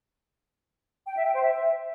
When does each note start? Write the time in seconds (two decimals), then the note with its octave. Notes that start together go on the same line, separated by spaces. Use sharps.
1.08 G5
1.16 E5
1.25 G5
1.34 C5
1.43 E5